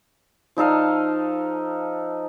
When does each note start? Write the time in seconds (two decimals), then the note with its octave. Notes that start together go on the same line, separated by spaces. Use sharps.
0.57 F3 D#4 A4 F5